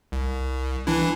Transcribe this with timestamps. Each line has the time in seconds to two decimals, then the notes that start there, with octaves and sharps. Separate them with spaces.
0.12 C2
0.87 E3 D4 E4